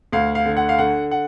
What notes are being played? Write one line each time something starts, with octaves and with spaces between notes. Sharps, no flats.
D2 F5
F5
D3
F#5
F5
D3 F#5
F#5